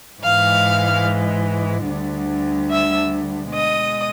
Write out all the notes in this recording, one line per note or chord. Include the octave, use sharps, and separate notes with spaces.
G#2 E3 G#3 F5 F6
D2 D3 G3
E5 E6
B2 G#3 D#5 D#6